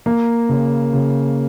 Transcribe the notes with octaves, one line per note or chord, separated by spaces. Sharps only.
A#3
C#3
C#3